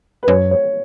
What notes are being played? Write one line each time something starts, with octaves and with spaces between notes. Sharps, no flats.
B4
F#2 C#5
C#5